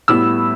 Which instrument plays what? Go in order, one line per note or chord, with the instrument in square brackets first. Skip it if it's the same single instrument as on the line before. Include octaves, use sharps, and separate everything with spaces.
[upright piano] A2 G3 B3 E4 E6